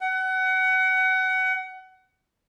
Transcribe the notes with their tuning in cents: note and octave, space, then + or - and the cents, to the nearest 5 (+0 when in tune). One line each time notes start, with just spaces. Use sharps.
F#5 +25